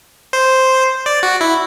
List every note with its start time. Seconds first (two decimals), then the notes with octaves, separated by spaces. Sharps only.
0.33 C5
1.06 D5
1.23 F#4
1.41 E4